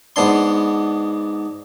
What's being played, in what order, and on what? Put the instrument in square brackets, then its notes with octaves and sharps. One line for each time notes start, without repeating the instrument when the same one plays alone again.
[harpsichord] G#2 B3 D4 C6